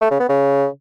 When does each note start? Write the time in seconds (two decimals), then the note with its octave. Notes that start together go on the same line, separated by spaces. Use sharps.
0.02 A3
0.11 C#3
0.20 B3
0.29 C#3